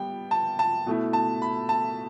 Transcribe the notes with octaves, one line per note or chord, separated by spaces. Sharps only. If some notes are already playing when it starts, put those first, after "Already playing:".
Already playing: G3 B3 G5
A5
A5
B2 A3 E4
A5
B5
A5